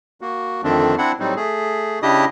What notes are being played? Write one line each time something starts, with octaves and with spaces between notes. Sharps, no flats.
A#3 F#4
F2 D3 D#3 A3 C4 D4
C4 D4 E4 F#5
A2 F#3 G3 C4 D#4
A3 G#4
C#3 D4 E4 G4 D#5 D#6